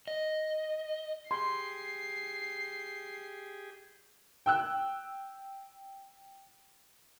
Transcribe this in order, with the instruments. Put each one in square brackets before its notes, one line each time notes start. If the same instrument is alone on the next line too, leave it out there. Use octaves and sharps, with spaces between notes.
[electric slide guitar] D#5
[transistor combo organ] G4 G#4 [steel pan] C6 [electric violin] C7
[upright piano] G5 E6 F#6